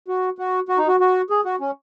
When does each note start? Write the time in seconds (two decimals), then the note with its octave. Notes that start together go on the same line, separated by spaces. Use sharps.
0.08 F#4
0.38 F#4
0.69 F#4
0.78 D#4
0.88 F#4
1.00 F#4
1.30 G#4
1.45 F#4
1.60 C#4